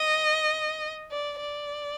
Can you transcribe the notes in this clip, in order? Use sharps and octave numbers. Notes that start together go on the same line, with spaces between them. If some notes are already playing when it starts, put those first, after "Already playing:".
Already playing: D#5
D5
D5